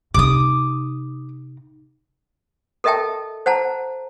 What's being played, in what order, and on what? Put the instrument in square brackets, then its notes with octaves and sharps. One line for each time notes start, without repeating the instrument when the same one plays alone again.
[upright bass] C3 D#4 [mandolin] D6 D#6
[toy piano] A4 A#4 D#5 E5 G5 A5
C5 F#5 A5 A#5